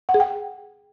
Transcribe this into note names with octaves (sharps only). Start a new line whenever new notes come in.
F#5
G#4
G5